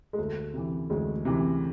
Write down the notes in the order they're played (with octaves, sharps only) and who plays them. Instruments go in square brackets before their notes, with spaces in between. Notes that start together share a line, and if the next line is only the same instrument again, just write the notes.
[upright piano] G#3
[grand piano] D2 [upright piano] A3
[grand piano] C3 E3
[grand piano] D2 [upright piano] G#3
[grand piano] C3 E3